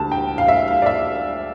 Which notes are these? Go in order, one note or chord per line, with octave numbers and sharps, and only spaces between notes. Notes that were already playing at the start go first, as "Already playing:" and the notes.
Already playing: D2 D3 A5
G5
F5
E5
F5
D5
E5